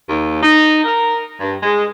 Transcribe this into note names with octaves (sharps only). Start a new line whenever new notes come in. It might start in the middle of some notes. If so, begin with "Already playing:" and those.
D#2
D#4
A#4
G2
G#3